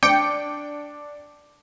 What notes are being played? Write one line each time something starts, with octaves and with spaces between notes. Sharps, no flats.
D4 G5 D6 C#7